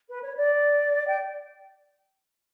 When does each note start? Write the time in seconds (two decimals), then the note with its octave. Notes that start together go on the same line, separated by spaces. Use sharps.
0.09 B4
0.22 C#5
0.37 D5
1.07 G5